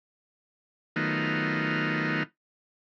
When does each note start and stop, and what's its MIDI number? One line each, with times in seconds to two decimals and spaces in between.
0.96 2.23 51
0.96 2.23 54
0.96 2.23 57
0.96 2.23 59
0.96 2.23 63
0.96 2.23 65